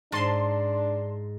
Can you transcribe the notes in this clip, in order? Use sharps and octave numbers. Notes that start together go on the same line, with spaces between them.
G#2 D4 A5 C6